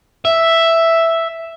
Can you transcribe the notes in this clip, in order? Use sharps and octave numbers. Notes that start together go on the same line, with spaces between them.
E5